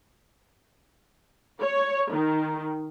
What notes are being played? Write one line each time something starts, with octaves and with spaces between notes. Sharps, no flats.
C#5
D#3